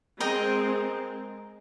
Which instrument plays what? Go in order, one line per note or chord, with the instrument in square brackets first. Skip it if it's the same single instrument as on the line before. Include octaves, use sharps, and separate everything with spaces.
[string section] G#3 C4 [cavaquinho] A#4 D#5 G5